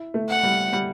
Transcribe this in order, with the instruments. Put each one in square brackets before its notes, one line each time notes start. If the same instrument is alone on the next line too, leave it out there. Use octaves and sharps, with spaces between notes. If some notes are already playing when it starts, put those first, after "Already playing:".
Already playing: [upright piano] E4
A3
[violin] F#5
[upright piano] G3
G3